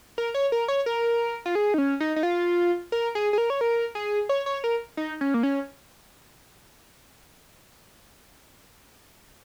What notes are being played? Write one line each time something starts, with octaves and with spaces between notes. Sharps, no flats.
A#4
C#5
A#4
C#5
A#4
F4
G#4
D#4
C#4
D#4
D#4
F4
A#4
G#4
G#4
A#4
C#5
A#4
G#4
C#5
C#5
A#4
D#4
C#4
A#3
C#4